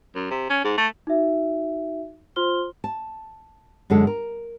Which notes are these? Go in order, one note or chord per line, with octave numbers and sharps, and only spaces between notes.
F#2
C3
C#4
G#2
A3
D#4 F#4 E5
F4 C5 C6 F6 G7
A5
F#2 D3 G#3 A4
A#4